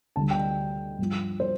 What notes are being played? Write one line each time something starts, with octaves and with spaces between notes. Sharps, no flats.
D2 D3 G3 A5
G5
G2 F3
C5